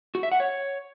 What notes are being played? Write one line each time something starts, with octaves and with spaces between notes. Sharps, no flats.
F#4
E5
F#5
C#5